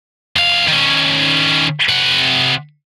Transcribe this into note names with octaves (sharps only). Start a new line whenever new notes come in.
E2 F5
D#3 C#4
C3 F#5